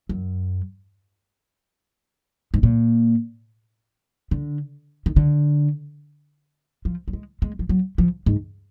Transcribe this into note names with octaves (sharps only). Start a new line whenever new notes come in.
F#2
G#2
A#2
D3
D#3
D3
F3
F#3
G#3
G#3
F3
F#3
F3
G#2